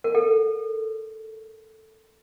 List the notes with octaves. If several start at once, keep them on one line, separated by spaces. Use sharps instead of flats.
A#4
A4